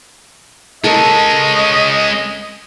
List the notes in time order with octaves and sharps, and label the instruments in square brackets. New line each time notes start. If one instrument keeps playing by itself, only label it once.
[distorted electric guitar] G#3 C#4 [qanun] A4 A#4 [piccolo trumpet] D#5